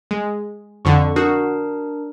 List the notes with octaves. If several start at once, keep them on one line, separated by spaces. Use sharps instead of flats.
G#3
F2 D3 C#6
D4 F#4 A#4